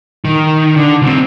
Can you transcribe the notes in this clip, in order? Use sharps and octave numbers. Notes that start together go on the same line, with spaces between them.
D#3
D3
C#2 C4